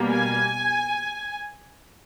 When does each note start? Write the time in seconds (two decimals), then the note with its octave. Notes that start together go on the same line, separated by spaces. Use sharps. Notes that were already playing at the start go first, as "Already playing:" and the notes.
Already playing: B2 G3 A#3
0.09 G#5